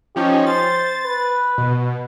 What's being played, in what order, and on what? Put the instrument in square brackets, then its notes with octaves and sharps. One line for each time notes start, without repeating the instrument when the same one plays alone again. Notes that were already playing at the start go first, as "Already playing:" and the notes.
[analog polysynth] F3 C#4 D#4 [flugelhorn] G4
[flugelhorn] C5 [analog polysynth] A6
[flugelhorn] B4
[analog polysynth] B2